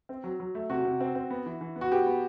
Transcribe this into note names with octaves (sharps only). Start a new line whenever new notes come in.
C4
F#3
F#3
A3
C3 F#4
C3
C4
C4
B3
E3
E3
B3
F#4
B3 G4
B3